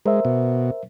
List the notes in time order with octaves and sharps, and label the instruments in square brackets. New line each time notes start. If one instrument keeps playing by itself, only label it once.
[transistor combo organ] G#3 [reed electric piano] A#4 C5 E5
[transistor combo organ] B2